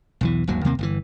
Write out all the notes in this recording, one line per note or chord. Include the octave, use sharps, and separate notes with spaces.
B1 E2 E3
D#1 G#1 D#2 F#3
D#2 C3 A#3
G1 C#3 E3